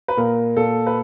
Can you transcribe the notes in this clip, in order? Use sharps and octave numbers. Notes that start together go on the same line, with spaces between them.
B4
A#2 A#4
A#2 A4
B4